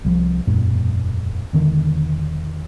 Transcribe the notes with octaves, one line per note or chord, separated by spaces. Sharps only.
C2 E3 F3
E1 F#2 A#2
E1 D3 D#3